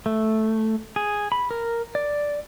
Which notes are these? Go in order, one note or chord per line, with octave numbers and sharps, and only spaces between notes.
A3
G#4
B5
A#4
D5